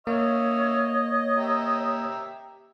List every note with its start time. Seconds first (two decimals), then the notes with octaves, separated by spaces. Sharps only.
0.07 A#3 C#5 D#5 E5 C#6 F6
1.36 G4 A#4 E5